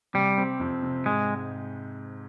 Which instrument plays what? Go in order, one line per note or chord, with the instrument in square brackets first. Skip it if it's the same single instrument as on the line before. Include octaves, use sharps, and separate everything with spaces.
[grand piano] C3 [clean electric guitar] G3
[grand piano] C4
F2
C3
[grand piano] G#2 [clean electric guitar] G#3